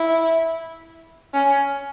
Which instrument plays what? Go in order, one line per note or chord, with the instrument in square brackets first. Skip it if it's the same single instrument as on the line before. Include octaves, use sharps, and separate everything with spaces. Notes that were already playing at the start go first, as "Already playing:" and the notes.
Already playing: [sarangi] E4
C#4